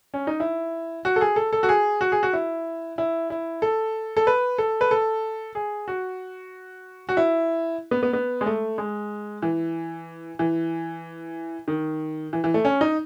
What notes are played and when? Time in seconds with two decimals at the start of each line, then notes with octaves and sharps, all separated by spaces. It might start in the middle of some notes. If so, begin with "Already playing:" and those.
0.14 C#4
0.27 D#4
0.40 E4
1.05 F#4
1.16 A4
1.21 G#4
1.36 A4
1.53 A4
1.63 F#4
1.69 G#4
2.01 F#4
2.12 G#4
2.23 F#4
2.33 E4
2.98 E4
3.30 E4
3.62 A4
4.17 A4
4.27 B4
4.58 A4
4.81 B4
4.91 A4
5.55 G#4
5.88 F#4
7.09 F#4
7.17 E4
7.91 B3
8.03 B3
8.13 B3
8.41 G#3
8.46 A3
8.78 G#3
9.42 E3
10.39 E3
11.68 D#3
12.33 E3
12.44 E3
12.54 A3
12.65 C#4
12.81 D#4